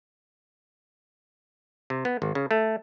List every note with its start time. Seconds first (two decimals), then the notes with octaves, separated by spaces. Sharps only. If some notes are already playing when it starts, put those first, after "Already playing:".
1.90 C3
2.05 B3
2.22 G#1
2.35 C#3
2.51 A3